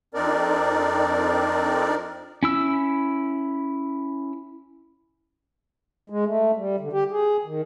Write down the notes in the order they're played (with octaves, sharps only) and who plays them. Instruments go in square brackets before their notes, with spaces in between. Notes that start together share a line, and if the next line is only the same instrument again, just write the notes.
[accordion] F2 C4 D4 D#4 A#4 D5
[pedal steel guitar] C#4 E4 E6
[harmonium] G#3
A3
G3
D3
G4
G#4
D#3